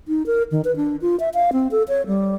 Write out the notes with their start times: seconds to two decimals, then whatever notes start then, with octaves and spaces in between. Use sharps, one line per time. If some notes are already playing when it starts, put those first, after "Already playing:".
0.08 D#4
0.26 A#4
0.51 D#3
0.65 B4
0.76 D4
1.01 F4
1.20 E5
1.34 F5
1.53 C4
1.71 A4
1.88 C#5
2.07 G3